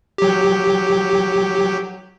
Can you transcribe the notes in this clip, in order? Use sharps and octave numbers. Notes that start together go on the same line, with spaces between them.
F#3 G4